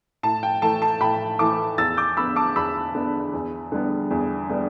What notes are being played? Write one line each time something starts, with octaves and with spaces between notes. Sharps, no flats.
A2 A5
G5
E3 A3 A5
A5
A2 G5 B5
E3 A3 A5 D6
E2 E6 A6
D6 G6
D3 B3 B5 E6
A5 D6
E2 B5 E6
D3 B3
E2
D3 G3 B3
E2
D3 G3 B3